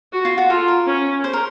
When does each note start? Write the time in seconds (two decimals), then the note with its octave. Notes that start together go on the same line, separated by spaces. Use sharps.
0.13 F#4
0.25 F4
0.38 F#4
0.49 F4 A4
0.68 A#4
0.86 C#4
1.24 C5
1.33 A#4